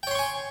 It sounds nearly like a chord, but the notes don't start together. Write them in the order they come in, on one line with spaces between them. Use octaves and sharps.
G5 C#5 C6 C#6 G#5